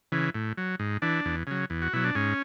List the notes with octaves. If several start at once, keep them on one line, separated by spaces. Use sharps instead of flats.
C#3 E3
A2
F#3
G#2
E3 D4
E2
C#3 F#3
E2
F#4
B2 F#3 E4
D4
G#2 C#4